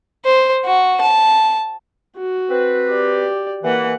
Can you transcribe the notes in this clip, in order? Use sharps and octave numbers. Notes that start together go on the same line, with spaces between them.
C5
F#4
A5
F#4
C4 B4
G4 D5
E3 A#3 F#5